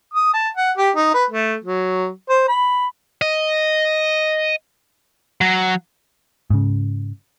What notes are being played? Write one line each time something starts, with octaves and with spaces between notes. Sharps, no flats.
D#6
A5
F#5
G4
D#4
B4
A3
F#3
C5
B5
D#5
F#3
G#2 C#3